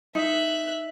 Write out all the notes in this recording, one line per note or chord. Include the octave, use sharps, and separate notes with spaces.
D#4 E5 F#6